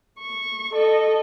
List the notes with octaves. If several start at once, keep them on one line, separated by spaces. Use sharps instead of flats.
C#6
A4 D#5